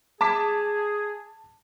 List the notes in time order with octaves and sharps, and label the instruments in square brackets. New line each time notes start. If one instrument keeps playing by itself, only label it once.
[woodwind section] G#4 [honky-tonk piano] A5 D6 B6